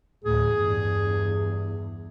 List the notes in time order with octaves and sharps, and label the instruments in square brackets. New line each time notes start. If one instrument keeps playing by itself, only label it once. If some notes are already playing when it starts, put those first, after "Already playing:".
[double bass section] D2 A2 [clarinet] G#4
[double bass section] E2 G2